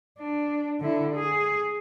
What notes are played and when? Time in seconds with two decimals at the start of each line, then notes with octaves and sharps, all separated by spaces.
0.19 D4
0.80 D3 E4
1.16 G#4